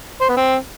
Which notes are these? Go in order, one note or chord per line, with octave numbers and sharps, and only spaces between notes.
C5
B3
C4